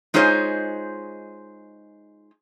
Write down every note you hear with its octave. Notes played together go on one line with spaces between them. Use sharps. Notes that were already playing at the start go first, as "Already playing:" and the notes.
G#3 D#4 F4 G#4 C5 C#5